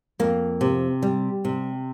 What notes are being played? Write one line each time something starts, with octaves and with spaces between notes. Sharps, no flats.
F2 A#3
C3
G3
C3